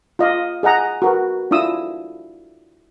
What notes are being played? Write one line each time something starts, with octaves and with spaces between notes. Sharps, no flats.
F4 D#5 F5
G#4 D#5 F#5 A#5 D#6
F#4 A#4 B4
D4 E4 F4 D#6 E6